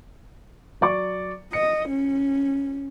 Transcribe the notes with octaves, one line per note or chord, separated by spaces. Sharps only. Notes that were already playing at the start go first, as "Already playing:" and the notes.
F#3 D5 C#6
D#5 C#7
C#4